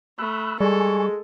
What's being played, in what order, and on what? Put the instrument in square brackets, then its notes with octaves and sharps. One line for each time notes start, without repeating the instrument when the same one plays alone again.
[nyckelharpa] A3 [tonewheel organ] B5 E6 F#6
[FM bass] G3 [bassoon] G#3 [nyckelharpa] A4 [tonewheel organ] G#5 C#6